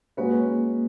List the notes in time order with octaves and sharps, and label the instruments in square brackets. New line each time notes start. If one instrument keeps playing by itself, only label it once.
[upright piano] G#3 C#4 F#4 B4 [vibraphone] A#3